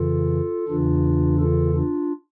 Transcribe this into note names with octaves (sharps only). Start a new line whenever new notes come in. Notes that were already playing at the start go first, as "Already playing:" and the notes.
Already playing: F2 C#3 E3 F4 A4
E2 C#3 E3 D4 F4
F4 A4
D4 F4